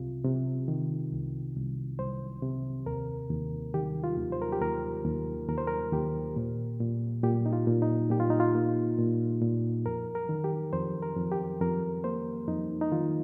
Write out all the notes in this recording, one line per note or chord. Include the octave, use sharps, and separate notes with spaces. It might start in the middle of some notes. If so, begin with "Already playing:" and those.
Already playing: C2 C3 F4
C3
D#3
C2
C2
C2 C5
C3
D#2 A#4
D#2
D#3 G4
F4
D#2
C5
A#4
G4
D#2 A#4
D#2
D#2 A#4
C5
A#4
D#2 G4
A#2
A#2
A#2 G4
D#4
F4
A#2
D#4
A#2 G4
F4
D#4
F4
A#3
A#2
A#2
F2 A#4
A#4
D#3
G4
F2 C5
A#4
F2
G4
F2 A#4
A#3 C5
F2 D#4
D#4
D#3 F4